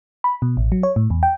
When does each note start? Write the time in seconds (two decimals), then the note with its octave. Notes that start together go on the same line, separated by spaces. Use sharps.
0.24 B5
0.42 B2
0.57 A1
0.72 F#3
0.83 C#5
0.96 A2
1.10 E2
1.23 G5